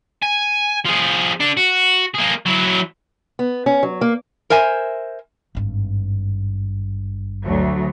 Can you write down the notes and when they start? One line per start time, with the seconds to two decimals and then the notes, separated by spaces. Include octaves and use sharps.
0.23 G#5
0.86 F3 G#4
1.40 D4 A4
1.57 F#4
2.15 A#3 G#4
2.46 F#3 E4
3.39 B3
3.66 C#4
3.83 F#3
4.01 A#3
4.50 A#4 C5 E5 G#5
5.55 G#1 G2
7.43 D2 F#3